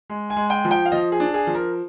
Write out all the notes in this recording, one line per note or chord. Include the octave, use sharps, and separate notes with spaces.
G#3
G#5
G#3
G5
F3
G5
F5
F3 D#5
G#4
D4
G#4
F3
A#4